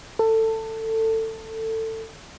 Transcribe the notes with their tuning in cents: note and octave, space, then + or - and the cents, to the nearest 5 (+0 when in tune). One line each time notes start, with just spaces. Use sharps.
A4 +20